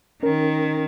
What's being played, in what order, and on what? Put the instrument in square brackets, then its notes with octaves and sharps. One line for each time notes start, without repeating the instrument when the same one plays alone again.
[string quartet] D#3 [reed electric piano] C#4 A#4